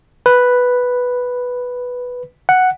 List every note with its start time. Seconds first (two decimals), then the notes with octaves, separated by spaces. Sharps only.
0.26 B4
2.49 F#5